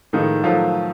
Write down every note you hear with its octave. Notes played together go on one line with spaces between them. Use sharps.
A2 D#3 F3 G#3 D#4
D#3 F3 F#3 A3 F4